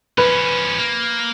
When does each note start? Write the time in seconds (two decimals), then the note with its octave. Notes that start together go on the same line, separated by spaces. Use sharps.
0.18 F3 C#4 B4
0.78 A#3